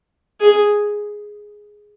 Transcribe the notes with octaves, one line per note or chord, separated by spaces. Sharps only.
G#4